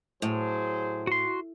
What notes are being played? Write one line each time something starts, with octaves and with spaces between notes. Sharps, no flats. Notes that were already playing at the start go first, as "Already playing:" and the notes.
A2 F#3 G#4 C5
F#4 C6